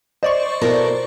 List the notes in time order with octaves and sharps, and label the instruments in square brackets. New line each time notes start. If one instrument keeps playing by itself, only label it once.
[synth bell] C5 D5 C#6 [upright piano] D#5
[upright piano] B2 E4 [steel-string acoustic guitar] B3 A4 A#4